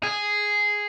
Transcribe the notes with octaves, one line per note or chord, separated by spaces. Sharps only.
G#4